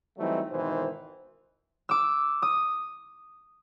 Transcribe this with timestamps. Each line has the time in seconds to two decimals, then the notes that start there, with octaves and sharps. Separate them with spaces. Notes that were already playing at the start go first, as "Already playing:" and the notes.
0.18 E3 F#3 G3 A3 C4 D#4
0.51 G#1 B2 D#3 E3 C5
1.89 D6 E6
2.42 D#6